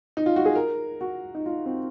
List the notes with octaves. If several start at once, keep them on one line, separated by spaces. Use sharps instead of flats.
D#4
F4
F#4
G#4
A#4
F#4
D#4
F4
C4